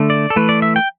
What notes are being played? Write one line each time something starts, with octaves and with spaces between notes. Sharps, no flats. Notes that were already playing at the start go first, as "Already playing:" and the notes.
Already playing: D3 A3
D5
A4
E3 A3 B4
D5
E5
G5